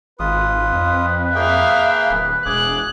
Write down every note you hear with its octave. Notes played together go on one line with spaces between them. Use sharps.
G#1 F4 B4 D#6
F2
A#3 G#4 E5 F5 G5
D1
E1 G#4 D6 F#6